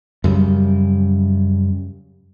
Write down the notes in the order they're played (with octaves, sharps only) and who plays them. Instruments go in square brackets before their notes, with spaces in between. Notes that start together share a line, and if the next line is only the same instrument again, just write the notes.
[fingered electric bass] F#2 C#3 G3